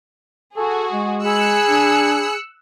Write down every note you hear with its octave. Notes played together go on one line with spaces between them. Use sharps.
F#4 G#4 A4
G#3
G#4 B5 E6 F#6 C#7
D4